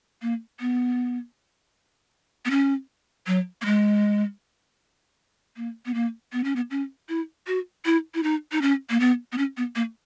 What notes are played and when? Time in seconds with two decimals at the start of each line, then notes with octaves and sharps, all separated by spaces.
0.22 A#3
0.60 B3
2.45 B3
2.51 C#4
3.27 F#3
3.62 A#3
3.65 G#3
5.57 A#3
5.86 B3
5.94 A#3
6.33 B3
6.44 C#4
6.56 B3
6.71 C#4
7.09 E4
7.47 F#4
7.85 E4
8.15 E4
8.23 D#4
8.52 D#4
8.62 C#4
8.90 A#3
9.00 B3
9.32 B3
9.38 C#4
9.57 B3
9.76 A#3